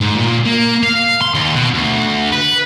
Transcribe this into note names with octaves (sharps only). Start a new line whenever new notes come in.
G#2
A#2
A#3
F5
C6
D#2
B2
D2
B4